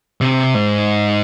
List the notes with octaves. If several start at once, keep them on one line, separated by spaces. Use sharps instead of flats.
C3
G#2